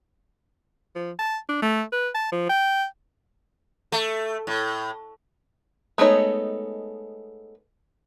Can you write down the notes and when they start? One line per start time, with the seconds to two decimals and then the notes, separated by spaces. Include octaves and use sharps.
0.95 F3
1.19 A5
1.49 D4
1.62 A3
1.92 B4
2.14 A5
2.32 F3
2.49 G5
3.92 A3
4.47 A2
5.98 G#3 A3 B3 D#4 C#5